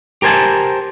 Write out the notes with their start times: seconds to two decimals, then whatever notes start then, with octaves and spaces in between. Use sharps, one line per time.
0.22 G4 A#4 C5 G#5 A5